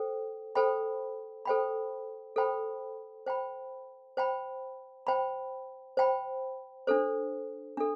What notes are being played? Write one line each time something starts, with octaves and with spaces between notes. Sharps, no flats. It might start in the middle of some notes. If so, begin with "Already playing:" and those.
Already playing: A4 C5 G5
A4 C5 G5 B5
A4 C5 G5 B5
A4 C5 G5 B5
C5 G5 B5
C5 G5 B5
C5 G5 B5
C5 G5 B5
D4 A4 C5
D4 A4